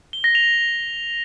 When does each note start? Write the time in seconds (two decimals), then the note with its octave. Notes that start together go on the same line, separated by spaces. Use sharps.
0.13 G7
0.24 A#6
0.35 F7